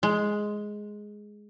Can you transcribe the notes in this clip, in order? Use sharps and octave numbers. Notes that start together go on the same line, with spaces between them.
G#3